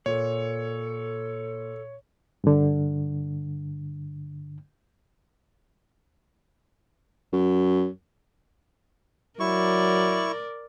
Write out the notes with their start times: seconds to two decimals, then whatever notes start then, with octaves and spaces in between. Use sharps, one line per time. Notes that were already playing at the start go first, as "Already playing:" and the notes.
0.06 A#2 A4 C#5
2.44 G2 D3
7.33 F#2
9.40 F#3 E4 A#4 D5 C#6